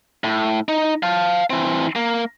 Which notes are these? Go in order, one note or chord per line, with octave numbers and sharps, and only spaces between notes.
A2
D#4
F5 A5
E3 C4
A#3